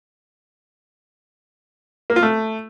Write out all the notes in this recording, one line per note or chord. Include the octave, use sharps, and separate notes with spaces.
A#3
F4
A3